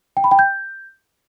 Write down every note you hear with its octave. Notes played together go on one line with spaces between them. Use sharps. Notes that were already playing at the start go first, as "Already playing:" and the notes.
G5
B5
G5
G6